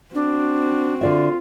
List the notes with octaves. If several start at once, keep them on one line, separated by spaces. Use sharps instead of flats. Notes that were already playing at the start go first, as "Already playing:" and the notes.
C4 D4 F#4
D3 F4 D5 E5